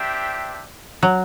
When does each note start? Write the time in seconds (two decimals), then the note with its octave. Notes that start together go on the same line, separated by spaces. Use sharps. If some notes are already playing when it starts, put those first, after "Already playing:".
Already playing: D4 G4 C5 E5 G5
1.03 F#3